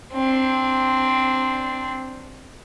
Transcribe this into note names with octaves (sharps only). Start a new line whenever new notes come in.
C4 D4